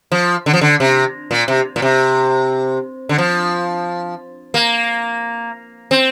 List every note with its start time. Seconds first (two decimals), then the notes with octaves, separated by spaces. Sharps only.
0.12 F3
0.46 D3
0.53 F3
0.61 D3
0.80 C3
1.31 A#2
1.48 C3
1.76 A#2
1.82 C3
3.09 D3
3.18 F3
4.54 A#3
5.91 C4